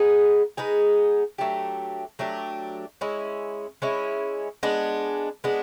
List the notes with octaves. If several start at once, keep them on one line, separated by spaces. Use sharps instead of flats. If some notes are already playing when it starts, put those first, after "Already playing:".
Already playing: G#3 B3 D#4 G#4
G#3 B3 D#4 G#4
F#3 A3 D4 G4
F#3 A3 D4 G4
G#3 C#4 E4
G#3 C#4 E4
G#3 B3 D4
G#3 B3 D4